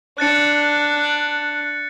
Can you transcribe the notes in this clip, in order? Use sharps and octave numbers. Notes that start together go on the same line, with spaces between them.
D4 F#6 A6 C#7